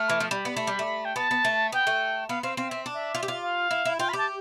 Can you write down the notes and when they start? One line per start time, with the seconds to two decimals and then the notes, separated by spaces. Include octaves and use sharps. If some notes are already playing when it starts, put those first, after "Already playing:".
Already playing: A3 F6
0.09 E3
0.20 F3
0.31 G3 B5
0.45 B3
0.56 A3
0.67 G3
0.79 A3
1.05 G5
1.16 B3 A5
1.31 B3
1.45 A3
1.72 B3 G5
1.87 A3
2.29 B3 F5
2.43 C4 F5
2.57 C4 F5
2.69 C4 E5
2.86 D4
2.94 E5
3.15 F4
3.23 G4
3.28 F4
3.42 F5
3.71 E4
3.85 E4
3.99 F4 G5
4.09 B5
4.13 G4 A5